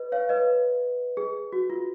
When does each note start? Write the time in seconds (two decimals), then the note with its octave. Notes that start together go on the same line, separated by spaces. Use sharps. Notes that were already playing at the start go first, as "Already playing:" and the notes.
Already playing: B4 D#5
0.12 C#5 F5
0.29 B4 D#5
1.17 G#4
1.53 F#4
1.70 F4